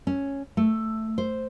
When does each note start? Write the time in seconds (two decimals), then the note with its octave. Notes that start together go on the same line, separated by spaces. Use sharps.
0.07 C#4
0.57 A3
1.18 C5